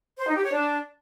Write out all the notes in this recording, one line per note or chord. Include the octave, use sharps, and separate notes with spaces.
C5
D#4
G4
C#5
D4